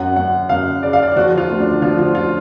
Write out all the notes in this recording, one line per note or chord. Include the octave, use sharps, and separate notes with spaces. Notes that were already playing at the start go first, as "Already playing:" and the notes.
Already playing: F#2 F#5
F#2 F#5
F#2 F5
C#3 D5
F5
D5
F3 F#4
F4
D2
D4
F3 F4
F4
F4